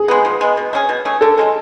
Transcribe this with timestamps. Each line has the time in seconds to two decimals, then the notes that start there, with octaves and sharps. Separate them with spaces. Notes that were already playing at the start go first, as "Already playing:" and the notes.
Already playing: G#4
0.08 G#3 B3
0.25 F3
0.41 G#3 B3
0.57 B2
0.73 A3 C#4 G#4
0.89 B2
1.05 A3 C#4 G#4
1.21 D3 A4
1.38 F3 G#3 C#4